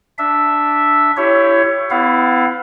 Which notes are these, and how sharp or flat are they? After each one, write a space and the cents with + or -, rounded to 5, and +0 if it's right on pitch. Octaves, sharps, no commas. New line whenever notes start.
D4 +0 E5 +0
E4 +30 G4 +0 C#5 +10
B3 +40 E4 +0 F5 +25